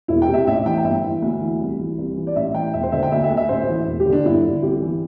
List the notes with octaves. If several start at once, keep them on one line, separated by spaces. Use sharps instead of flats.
E1 E4
G5
C3
E5
A1 E5
E3 G5
G5
G1 E5
E3
D2
E3
C2
E3
C2
E3
D5
A1 E5
E3 G5
E1 E5
C5
D3 E5
G5
D2 E5
E5
D2
E5
A1 C5
E3
E1
G4
D3
D4
G1 E4
D3
C2 G4
E3